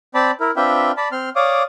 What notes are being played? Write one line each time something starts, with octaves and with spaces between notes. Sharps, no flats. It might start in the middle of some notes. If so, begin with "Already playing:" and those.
C4 D5 A5 B5
E4 A#4
C4 D4 F4 B4 E5 G5
D5 A5 B5
C4 C6 F6
C#5 D5 F5 D6 D#6